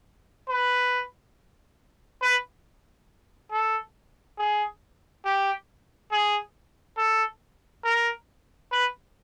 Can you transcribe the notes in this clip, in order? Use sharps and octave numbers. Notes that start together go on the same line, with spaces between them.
B4
B4
A4
G#4
G4
G#4
A4
A#4
B4